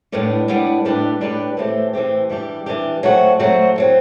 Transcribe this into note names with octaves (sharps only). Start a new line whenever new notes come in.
A2 G3 B3 D4
A2 G3 B3 D4
A2 G3 D4 G4 B4
A2 G3 D4 G4 B4
A2 E3 A3 C4 G4
A2 E3 A3 C4 G4
E3 G3 D4 G4
E3 G3 D4 G4
F#3 A3 C4 F#4
F#3 A3 C4 F#4
A2 F#3 C4